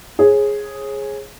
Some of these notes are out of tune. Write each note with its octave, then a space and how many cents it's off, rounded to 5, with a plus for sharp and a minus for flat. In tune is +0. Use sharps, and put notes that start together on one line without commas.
G#4 +0 C#5 -35